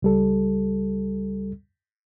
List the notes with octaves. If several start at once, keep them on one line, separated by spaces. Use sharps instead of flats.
C#2 G3 A4